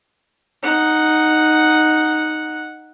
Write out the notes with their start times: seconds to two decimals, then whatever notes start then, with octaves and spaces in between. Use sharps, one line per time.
0.63 D#4 F#5